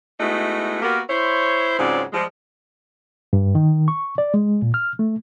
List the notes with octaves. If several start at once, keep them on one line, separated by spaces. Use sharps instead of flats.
G#3 A3 B3 D#4 E4 F#4
A#3 B3 F#4 G4 A#4
E4 C5 C#5
G#2 C#3 F#3 C4 F4 D5
F3 G3 G#3
G2
D#3
C#6
D5
G#3
A#2
F6
A3